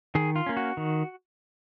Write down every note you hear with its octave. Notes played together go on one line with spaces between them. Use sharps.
D#3 G#4
F4
A#3 C#4
F#4
D#3